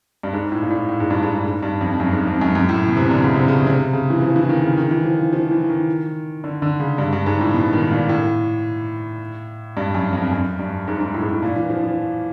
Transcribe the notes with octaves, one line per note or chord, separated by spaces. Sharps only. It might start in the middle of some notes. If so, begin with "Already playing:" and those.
G2
G#2
A2
A#2
A2
A2
G#2
G2
G#2
G#2
G2
F2
F#2
G#2
F2
F#2
F#2
A2
B2
C3
D3
C#3
C3
C#3
C3
C#3
E3
F3
E3
D#3
C#3
D#3
E3
F3
F3
F3
E3
D#3
D3
D3
C#3
G2
G2
G#2
A2
B2
D#3
A#2
A2
G2
F#2
F2
F#2
G2
G#2
G#2
A2
G#2
A2
A#2
E3
F3
F3